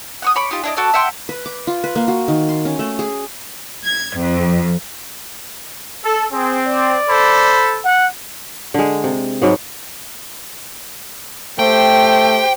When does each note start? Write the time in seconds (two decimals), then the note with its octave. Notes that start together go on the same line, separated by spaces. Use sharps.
0.22 F#5 C#6 D#6
0.36 C#5 B5 D6
0.51 D#4 F4 G4
0.64 D4 E4 D#5
0.77 F#4 A4 D5
0.94 E5 F#5 G5 C6
1.29 B4
1.46 D6
1.67 F4
1.84 B4
1.96 A#3
2.08 F#4
2.28 D#3
2.48 C6
2.65 C#4
2.79 A3
2.99 G#4
3.84 G#6
4.17 F2
6.03 A4
6.32 C4 G#4
6.66 D5
7.08 A4 C5 B5
7.84 F#5
8.74 D3 G#3
9.04 C3
9.42 G#2 F#3 B3
11.59 A3 G4 C5 G5